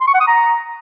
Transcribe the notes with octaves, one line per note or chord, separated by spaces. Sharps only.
C6
C#6
F#5
D#6
A#5